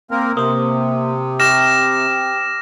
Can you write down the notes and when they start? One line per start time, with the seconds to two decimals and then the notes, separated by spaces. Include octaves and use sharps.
0.11 A#3 C4 A#4
0.37 C3 A#3 C5 D#6
1.40 G4 G5 C#6 D6 F6 A#6 E7